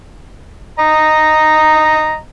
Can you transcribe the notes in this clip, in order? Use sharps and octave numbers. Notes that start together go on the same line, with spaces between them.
D#5 A#5